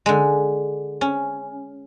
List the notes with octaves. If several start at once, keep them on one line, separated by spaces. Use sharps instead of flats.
D3 G#3
C#4